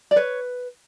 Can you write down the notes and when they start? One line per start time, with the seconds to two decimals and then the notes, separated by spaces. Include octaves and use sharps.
0.11 D5
0.16 B4 C#5